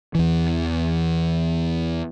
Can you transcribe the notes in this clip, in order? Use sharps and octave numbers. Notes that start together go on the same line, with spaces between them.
E2 E3